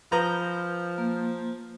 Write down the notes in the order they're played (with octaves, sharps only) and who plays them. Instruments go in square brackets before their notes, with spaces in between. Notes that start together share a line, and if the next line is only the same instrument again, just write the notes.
[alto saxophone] F3 [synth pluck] B4 D#6 G6 [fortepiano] A#5
[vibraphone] A#3